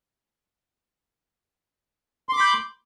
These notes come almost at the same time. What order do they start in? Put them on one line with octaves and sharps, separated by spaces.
C6 D6 B5 G6